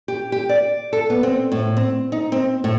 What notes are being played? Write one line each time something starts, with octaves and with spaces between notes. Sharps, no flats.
G4
G4
D5
A4
B3
C4
A2
C4
D#4
C4
A2